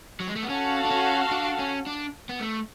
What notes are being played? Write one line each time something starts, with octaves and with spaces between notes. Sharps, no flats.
F#3
G#3
A3
B3
C#4 F#4 A4 F5
D4
C#4
D4
C#4
D4
B3
A3